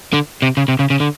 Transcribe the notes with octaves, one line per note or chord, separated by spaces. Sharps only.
D3
C3
C#3
C3
C#3
C#3
D3